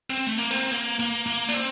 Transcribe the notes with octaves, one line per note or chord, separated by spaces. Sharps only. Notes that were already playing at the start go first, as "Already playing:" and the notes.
C4
A3
A#3
C4
A#3
A#3
A#3
D4
C4